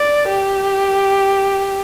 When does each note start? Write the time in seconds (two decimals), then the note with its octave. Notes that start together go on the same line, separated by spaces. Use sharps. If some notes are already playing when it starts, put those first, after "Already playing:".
Already playing: D5
0.29 G4